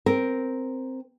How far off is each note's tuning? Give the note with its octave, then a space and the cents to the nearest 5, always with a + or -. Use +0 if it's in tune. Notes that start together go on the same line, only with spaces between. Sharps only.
C4 +0 A#4 +0